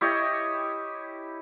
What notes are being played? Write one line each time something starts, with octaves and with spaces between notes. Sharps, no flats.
E4 G4 C#5 D#5